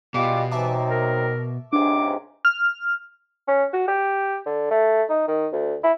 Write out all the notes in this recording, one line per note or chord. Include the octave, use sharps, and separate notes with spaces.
B2 G3 G#3 F4 G4 D6
E3 F#3 C4 D#4 E5 A5 D6
A#4
C#2 G#2 C3 D4 G#4 D6
F6
C#4
F#4
G4
D3
A3
D#4
D#3
D2
E4